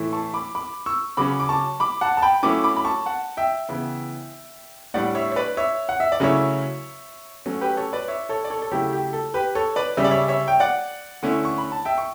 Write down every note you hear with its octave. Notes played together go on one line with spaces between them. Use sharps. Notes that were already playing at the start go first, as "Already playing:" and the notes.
Already playing: A2 E3 A3 E4
A5 C#6
B5 D6
B5 D6
C#6 E6
C#3 F#3 C#4 B5 D6
D6
A5 C#6
B5 D6
F#5 A5
A5
G5 B5
F#3 A3 C#4 E4 B5 D6
B5 D6
B5
A5 C#6
F#5 A5
E5 G5
C#3 E3 B3 E4
A2 G3 D4 D5 F#5
C#5 E5
C#5
B4 D5
C#5 E5
F#5
E5
D5
C#3 F#3 A3 C#4 E4 C#5 E5
F#3 A3 C#4
G4 B4
A4 C#5
B4 D5
C#5 E5
A4 C#5
D5
A4 C#5
A4
C#3 F#3 A3 E4 G4
G4
A4
G4 B4
A4 C#5
B4 D5
C#3 G3 C#4 E5
D5
C#5 E5
C#5 E5
G5
D5 F#5
D3 A3 C#4 E4
C#6
B5
A5
E5 G5
C#6